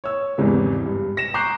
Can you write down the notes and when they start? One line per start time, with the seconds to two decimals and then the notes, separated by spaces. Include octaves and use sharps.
0.04 C#5 E6
0.37 G#1 E2 G#2 C#3 E3 G3
0.86 G2
1.17 A#6 E7
1.34 A#5 C#6 D6 F#6 G6 C7